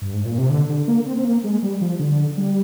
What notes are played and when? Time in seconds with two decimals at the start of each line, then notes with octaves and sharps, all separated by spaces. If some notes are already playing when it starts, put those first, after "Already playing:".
0.02 G2
0.14 G#2
0.25 A#2
0.38 C3
0.50 D3
0.69 D3
0.88 A#3
1.06 C4
1.17 C4
1.25 A#3
1.44 G#3
1.63 G3
1.81 F3
1.99 D3
2.37 G3